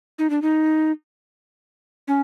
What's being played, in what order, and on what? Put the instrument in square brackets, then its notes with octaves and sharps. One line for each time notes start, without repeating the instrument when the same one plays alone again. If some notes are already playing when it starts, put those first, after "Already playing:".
[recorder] D#4
D4
D#4
C#4